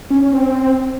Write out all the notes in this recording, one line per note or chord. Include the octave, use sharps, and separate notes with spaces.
C#4
C#4
C4